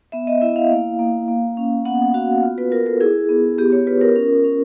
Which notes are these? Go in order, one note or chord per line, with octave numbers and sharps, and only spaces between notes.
B3 E5
D#5
E4 E5
F5
A#3
A#3
A#3
C#4
B3 F#5
F#4 F5
F4
B4
F4 A#4
A4
E4 G#4
B3
B3 G4
C#5
F4 B4
A#4
C#4
C#4